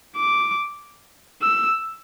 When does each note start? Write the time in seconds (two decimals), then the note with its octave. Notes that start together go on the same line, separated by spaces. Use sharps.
0.16 D6
1.42 E6